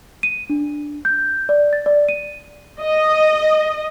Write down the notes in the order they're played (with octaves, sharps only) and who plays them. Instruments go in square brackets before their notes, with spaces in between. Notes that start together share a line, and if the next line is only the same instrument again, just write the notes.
[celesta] D#7
D4
G6
D5
A6
D5
D#7
[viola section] D#5